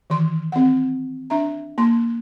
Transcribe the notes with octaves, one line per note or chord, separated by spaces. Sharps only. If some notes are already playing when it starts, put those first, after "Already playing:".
D#3 E3 C6
C4 F#5
D4 E5 A#5
A#3 C6